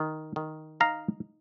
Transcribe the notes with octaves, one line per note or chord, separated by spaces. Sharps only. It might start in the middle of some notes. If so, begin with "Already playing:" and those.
Already playing: D#3
D#3
D#4 F5 A#5